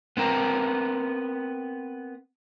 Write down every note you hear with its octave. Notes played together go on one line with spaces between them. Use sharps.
B3 C4 A#4 A#5